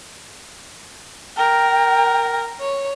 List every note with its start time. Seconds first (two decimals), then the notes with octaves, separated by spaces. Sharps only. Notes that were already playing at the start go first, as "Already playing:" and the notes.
1.38 A#4 G5
2.60 C#5